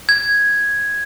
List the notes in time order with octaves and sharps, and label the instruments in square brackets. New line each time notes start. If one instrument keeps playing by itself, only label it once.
[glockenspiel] G#6